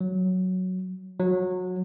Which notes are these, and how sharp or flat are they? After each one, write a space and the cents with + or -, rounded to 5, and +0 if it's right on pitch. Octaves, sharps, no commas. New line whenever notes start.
F#3 +0
F#3 -20